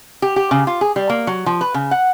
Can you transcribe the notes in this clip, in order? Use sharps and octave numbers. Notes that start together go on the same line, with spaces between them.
G4
G4
C#3
F4
G#4
G3
A#3
F#3
F3
B4
C#3
F#5